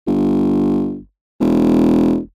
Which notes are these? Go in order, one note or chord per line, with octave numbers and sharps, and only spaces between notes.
G1
E1